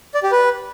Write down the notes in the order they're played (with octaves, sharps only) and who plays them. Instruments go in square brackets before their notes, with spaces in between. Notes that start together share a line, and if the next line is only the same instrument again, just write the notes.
[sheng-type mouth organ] D5
G4
B4